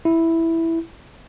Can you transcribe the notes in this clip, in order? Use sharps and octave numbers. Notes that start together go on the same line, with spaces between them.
E4